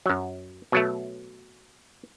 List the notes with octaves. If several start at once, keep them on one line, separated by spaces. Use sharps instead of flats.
F#2 F#3
B2 F#3 A3